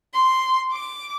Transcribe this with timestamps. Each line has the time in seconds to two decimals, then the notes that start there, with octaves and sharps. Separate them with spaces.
0.15 C6
0.73 D6